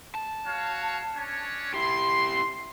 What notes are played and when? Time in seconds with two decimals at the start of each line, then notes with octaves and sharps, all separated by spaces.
0.15 A5
0.46 F#4 C#5 F5
1.15 C#4 D4 C#5
1.74 E4 G4 C6